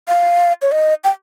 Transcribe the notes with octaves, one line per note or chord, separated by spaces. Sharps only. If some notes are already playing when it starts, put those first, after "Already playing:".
F5
C#5
D#5
G5